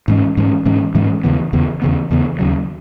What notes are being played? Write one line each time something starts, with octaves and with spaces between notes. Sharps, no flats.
G#2 E3 G#3 C#4
G#2 E3 G#3 C#4
G#2 E3 G#3 C#4
G#2 E3 G#3 C#4
E2 C#3 E3 B3
E2 C#3 E3 B3
E2 C#3 E3 B3
E2 C#3 E3 B3
D#2 C#3 F#3